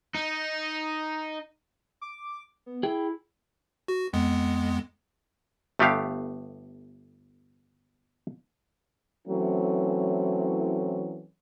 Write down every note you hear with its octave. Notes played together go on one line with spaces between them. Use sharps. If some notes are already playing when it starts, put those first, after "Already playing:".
D#4
D6
B3
E4 G#4 G5
F#4
F2 G#3 B3
G1 A3 B3 G4 F5
E3 F#3 A3 C4 C#4 E4